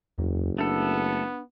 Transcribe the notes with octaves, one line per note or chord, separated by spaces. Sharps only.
F#1 E2
A3 B3 D4 A4